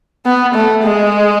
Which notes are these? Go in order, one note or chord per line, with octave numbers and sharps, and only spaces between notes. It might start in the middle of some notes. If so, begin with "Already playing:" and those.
B3
A3
G#3